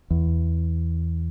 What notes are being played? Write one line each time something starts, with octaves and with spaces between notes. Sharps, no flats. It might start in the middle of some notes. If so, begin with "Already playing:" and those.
E2